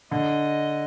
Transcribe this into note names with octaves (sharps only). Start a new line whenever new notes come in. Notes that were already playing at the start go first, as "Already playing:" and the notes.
D3 D#5